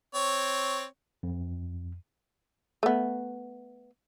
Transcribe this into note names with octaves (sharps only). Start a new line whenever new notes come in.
C4 C#5
F2
A3 B3